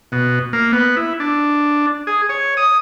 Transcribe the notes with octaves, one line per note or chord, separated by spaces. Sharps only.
B2
A#3
B3
E4
D4
G#4
C#5
D#6